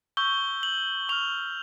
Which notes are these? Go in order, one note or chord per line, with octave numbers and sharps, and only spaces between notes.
C#6 E6 G6 G7
F#7
C#6 F6 F7